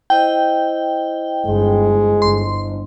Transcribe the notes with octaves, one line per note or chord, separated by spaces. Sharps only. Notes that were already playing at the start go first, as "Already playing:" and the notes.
E4 C5 D#5 G5
G1 G#3
G1 C6